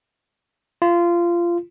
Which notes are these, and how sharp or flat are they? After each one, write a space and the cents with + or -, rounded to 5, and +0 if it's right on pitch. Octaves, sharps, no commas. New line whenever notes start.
F4 -20